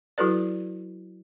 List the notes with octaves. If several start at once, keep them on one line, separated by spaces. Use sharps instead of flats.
F#3 E4 F#4 A4 B4 D5